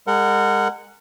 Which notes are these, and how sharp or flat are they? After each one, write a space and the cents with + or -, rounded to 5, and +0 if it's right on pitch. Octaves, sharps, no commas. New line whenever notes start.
G#3 -35 A#4 -30 F#5 +0